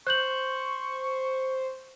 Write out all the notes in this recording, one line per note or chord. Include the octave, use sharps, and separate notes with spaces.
C5 C#6 F#6 G6 F#7